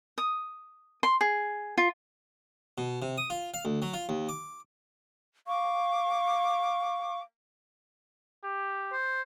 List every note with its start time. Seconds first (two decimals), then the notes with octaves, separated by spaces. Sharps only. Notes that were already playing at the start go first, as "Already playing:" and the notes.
0.18 D#6
1.03 C6
1.21 G#4
1.78 F4
2.78 B2
3.02 C3
3.18 D#6
3.30 F4
3.54 F5
3.65 D2
3.82 F#3
3.93 F4
4.09 D#2
4.29 D6
5.48 F5 C#6 D6
8.44 G4
8.93 C5